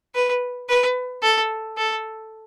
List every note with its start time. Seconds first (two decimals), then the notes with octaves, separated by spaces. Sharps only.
0.15 B4
0.69 B4
1.23 A4
1.77 A4